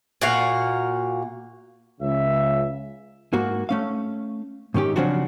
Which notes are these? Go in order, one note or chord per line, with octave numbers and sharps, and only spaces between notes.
A#2 F#4 F5
C#2 C#3 E5
G#2 A#3 F#4
A3 C#4 F5
G#2 D#3 C#4 G4
C#3 F3 F#3 C4 D4 F#4